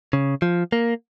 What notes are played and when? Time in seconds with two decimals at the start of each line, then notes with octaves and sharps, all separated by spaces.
0.13 C#3
0.42 F3
0.72 A#3